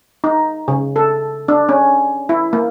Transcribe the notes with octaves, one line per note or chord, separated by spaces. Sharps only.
D#4
C#3
A4
D4
C#4
E4
A#3